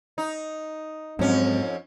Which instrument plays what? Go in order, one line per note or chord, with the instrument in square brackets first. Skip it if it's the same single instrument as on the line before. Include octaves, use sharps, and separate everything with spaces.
[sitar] D#4
[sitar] F2 C#4 [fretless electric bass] G#2 F#3 [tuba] C4